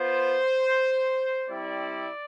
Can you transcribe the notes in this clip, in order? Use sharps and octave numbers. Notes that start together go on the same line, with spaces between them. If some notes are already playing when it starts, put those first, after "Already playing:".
Already playing: B3 F4 C5
G3 C4 E4 D5